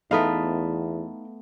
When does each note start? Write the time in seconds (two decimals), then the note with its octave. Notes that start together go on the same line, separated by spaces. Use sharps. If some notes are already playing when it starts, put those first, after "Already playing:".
0.11 E2 A3 B3 D#4 A4 D#5 F5